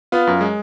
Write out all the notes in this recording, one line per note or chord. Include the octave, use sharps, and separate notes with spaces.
B3 F4
F#2
G#3